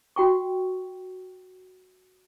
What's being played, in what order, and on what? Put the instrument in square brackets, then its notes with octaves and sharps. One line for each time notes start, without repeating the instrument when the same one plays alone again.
[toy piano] F#4 G5 C#6